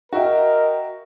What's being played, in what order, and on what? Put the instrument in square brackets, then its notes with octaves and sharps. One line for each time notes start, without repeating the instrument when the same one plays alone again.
[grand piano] F#4 E5 G5 [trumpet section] A#4 [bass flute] D#5